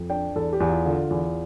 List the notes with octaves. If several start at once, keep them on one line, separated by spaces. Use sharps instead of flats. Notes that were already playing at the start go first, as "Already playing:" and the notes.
Already playing: F2
D4 G5
E2 A4
G4
E2
F4
D3 F4
E2